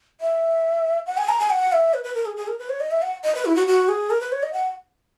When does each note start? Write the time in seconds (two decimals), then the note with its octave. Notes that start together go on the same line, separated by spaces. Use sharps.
0.21 E5
1.06 F#5
1.18 G#5
1.29 A#5
1.40 G#5
1.50 F#5
1.72 E5
1.94 B4
2.04 B4
2.15 A#4
2.26 G#4
2.37 G#4
2.48 A#4
2.59 B4
2.70 C#5
2.80 D#5
2.91 E5
3.02 F#5
3.24 D#5
3.35 B4
3.45 E4
3.56 F#4
3.67 F#4
3.89 G#4
4.10 A#4
4.21 B4
4.32 C#5
4.43 D#5
4.53 F#5